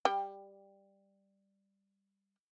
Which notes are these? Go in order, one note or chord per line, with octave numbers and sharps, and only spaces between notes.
G3 G5